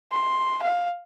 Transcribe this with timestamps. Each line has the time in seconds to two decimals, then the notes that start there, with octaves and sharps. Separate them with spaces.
0.12 C6
0.63 F5